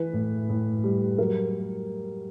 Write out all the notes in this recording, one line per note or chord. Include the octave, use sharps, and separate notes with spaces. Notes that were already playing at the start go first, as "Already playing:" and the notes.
Already playing: E3 B4
A2
A2
G3
F#3 A#4